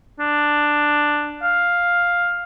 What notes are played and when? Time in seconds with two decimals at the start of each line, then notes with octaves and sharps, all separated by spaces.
0.20 D4
1.43 F5